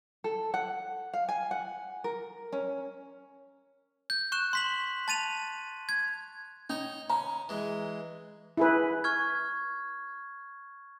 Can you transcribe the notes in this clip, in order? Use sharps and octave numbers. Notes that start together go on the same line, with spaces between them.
A4
F#5
F5
G#5
F#5
A#4
C#4
G6
C#6 F#6 E7
C6 B6 F#7
A5 A6 D#7 F7
G#6
C#4 D#4 C#5
C#4 A#5
E3 G#3
E4 G#4 B4
C#6 F6 G#6